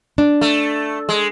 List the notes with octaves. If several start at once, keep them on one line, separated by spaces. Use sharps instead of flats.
D4
A3
G#3